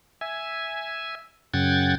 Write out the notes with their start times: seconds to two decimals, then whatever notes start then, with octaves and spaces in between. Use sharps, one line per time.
0.21 E5 G#5
1.54 F#2 C#3 F#5 G5 G#6 A6